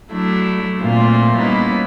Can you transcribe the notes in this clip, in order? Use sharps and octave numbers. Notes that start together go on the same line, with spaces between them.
F#3 A3 D4 E4
A#2 A3 A#3 C4 F4
G3 A#3 B3 C#4 D#4 E4